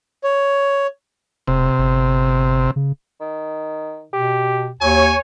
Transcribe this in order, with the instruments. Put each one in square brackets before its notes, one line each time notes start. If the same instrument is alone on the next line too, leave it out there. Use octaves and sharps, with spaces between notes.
[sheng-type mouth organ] C#5
[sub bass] E1 [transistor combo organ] C3
[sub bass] G1
C#3
[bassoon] D#3
[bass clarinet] B2 [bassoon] G4
[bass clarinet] D#2 [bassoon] F#3 [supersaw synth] C#5 [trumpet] G#5